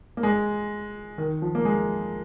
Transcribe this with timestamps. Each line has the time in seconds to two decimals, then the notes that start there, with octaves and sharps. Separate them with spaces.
0.17 A#3
0.23 G#3
1.18 D#3
1.42 F3
1.55 A#3
1.65 G#3